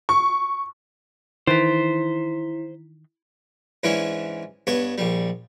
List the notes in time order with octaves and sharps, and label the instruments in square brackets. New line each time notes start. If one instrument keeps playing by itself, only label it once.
[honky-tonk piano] C#6
[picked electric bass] D#3 E3 [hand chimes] E4 B6 [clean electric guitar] C5
[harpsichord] G#2 E3 C#4 D4 E4
G2 B3 C#5 C#6
A#1 G3